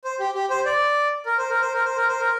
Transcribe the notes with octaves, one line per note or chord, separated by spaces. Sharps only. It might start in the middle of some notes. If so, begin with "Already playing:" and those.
C5
G4
G4
C5
D5
A#4
C5
A#4
C5
A#4
C5
A#4
C5
A#4